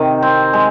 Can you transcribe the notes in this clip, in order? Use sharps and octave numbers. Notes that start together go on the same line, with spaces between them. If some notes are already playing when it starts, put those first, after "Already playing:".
Already playing: C3 D#3
C4
G#3